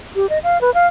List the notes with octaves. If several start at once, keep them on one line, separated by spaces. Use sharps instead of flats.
G4
D#5
F5
B4
F5